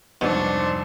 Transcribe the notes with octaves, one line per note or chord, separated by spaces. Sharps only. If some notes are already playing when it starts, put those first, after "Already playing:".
C2 F2 G#2 B2 D4 C5 C6 C#6